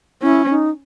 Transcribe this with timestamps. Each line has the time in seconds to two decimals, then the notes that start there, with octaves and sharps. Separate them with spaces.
0.22 C#4 E4
0.50 D#4